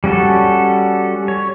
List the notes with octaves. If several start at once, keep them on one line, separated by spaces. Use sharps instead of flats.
G3 C#4 F#4 A4
C#5